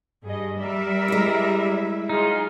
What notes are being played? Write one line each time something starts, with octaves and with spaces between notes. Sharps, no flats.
G2 G#4 D#5
G3 A#4 D5 E5
G#3 E4
F#3 D#4 F4 G#4